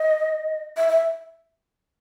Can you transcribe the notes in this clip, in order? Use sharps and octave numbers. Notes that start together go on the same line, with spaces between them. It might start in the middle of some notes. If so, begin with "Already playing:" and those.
Already playing: D#5
E5
E5